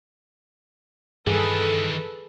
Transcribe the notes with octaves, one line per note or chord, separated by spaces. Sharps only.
G2 D#3 E3 G#4 A4 B4